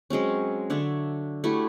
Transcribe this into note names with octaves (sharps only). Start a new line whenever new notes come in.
F#3 G#3 C4 C#4
D3 D4 C#5 E5
A3 E4 F#4 G4